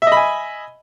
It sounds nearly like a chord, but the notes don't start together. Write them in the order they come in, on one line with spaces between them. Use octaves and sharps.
E5 D#5 B5 G#5